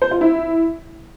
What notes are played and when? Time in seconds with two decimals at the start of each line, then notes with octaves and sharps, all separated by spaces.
0.02 C5
0.11 F4
0.21 E4